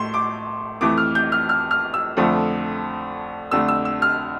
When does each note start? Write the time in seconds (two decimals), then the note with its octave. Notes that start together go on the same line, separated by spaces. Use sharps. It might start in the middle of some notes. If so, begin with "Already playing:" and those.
Already playing: A2 A3 C6
0.14 D6
0.81 F2 E3 A3 D6
0.98 F6
1.15 G6
1.32 F6
1.49 F6
1.71 F6
1.94 E6
2.17 F2 D3 F3 A3
3.51 F2 D3 A3 E6
3.68 E6
3.85 E6
4.02 F6